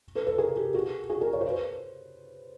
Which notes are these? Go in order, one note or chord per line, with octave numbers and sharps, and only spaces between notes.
A4 B4
A4 B4
G#4 A#4
G4 A4
F#4 G#4
F#4 G#4
G#4 A#4
C#5
C5
B4